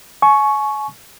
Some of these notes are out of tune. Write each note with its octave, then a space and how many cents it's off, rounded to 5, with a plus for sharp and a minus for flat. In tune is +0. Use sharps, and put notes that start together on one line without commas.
G#5 +35 C#6 +0